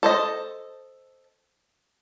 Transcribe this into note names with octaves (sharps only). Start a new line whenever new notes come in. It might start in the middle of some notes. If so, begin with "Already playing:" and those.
A4 C5 D#5